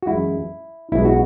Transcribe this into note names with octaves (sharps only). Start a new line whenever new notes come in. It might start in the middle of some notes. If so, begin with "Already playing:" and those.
F#4
F#2 E3 G#3 E4
B1 B2 G#3 E4
F#4